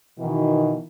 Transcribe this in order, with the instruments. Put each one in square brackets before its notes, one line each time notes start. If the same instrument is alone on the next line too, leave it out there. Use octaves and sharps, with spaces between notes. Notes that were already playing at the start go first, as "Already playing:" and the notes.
[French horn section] B2 D#3 E3